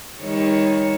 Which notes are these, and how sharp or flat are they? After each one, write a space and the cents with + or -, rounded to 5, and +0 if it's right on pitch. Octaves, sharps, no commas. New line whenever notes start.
D#3 +15 G3 +45 C#5 +0